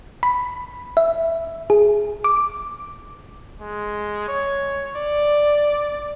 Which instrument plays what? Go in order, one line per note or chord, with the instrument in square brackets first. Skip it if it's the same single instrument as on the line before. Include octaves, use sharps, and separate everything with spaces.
[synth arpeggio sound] B5
E5
G#4
D6
[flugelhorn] G#3
C#5
D5